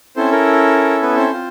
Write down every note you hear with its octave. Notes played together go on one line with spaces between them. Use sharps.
C4 C#4 E4 A4 C5
A#4
B3 B4
C4 C5
C4 F4